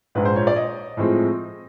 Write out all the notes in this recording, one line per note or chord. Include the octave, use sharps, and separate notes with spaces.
A#1 G#2 F3 B4
C5
C#5
D5
D#5
A2 F3 G#3 C4